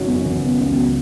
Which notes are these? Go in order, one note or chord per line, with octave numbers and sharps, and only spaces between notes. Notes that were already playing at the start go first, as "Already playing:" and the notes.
Already playing: G#1 C#3 F#3
F#2 B3
G#1
C#3
C#2
F#3